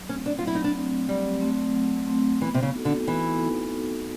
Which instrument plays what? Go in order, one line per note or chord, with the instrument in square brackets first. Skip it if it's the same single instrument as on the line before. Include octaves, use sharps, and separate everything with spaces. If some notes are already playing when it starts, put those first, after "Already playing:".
Already playing: [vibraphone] F#3
[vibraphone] A3 [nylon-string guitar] C#4
[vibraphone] C4
[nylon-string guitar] D4
F4
[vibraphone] F#3
[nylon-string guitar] E4
D#4
D4
[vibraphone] A3 C4
[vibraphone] F#3 [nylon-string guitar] G3
[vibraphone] A3 C4
F#3
A3 C4
[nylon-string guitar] E3 [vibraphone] B3
[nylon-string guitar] C3
C#3
[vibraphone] D#4 F#4 A4
[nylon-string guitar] D3
[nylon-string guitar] E3 [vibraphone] B3
[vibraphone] D#4 F#4 A4
B3